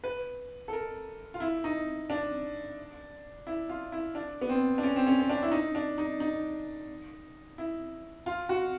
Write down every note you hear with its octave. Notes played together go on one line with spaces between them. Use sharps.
B4
A4
A#4
F4
E4
D#4
D4
E4
F4
E4
D4
B3
C4
D4
C#4
C4
C#4
C#4
D4
E4
D#4
D4
D#4
D#4
E4
F4
F#4